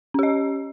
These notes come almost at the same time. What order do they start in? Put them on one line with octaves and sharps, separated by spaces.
C#4 G4 D#5